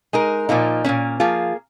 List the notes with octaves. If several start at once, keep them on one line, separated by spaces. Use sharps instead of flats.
G#3 D#4 A#4
A#2 F3 A#3 D#4
A#2 F#3 A#3 C#4
F3 A#3 F4 G#4